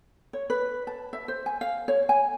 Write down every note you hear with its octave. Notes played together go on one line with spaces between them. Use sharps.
C#5
B4
A5
E5
C5
G#5
F5
C#5
G#5